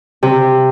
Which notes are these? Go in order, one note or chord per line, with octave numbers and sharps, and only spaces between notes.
C3